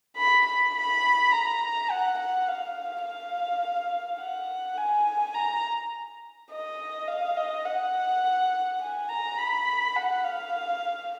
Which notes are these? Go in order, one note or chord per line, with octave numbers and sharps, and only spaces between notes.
B5
B5
B5
A#5
F#5
F#5
F5
F5
F#5
G#5
A#5
D#5
F5
D#5
F#5
G#5
A#5
B5
F#5
F5